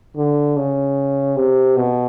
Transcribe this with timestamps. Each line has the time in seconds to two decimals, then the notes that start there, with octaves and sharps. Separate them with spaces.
0.16 D3
0.56 C#3
1.36 C3
1.76 B2